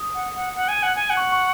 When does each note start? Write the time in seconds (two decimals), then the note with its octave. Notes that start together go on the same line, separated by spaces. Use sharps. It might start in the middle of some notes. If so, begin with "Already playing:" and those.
Already playing: D#6
0.14 F#5
0.35 F#5
0.56 F#5
0.68 G#5
0.83 F#5
0.96 G#5
1.10 F#5
1.17 C#6
1.32 C#6